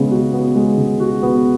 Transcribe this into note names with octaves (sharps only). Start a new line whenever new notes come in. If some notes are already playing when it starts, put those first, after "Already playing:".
Already playing: C#3 G#3 B3
F#4
B3
G#3
C#3
F#4
B3